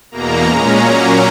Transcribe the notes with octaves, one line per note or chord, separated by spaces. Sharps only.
E2 B2 A#3 A#5
A#2 G#3 C#4 A#5
A#2 F#3 A#3 C#4